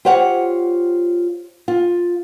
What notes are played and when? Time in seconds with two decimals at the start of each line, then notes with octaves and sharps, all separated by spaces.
0.05 F4 G4 C5 C#5 F#5
1.68 F4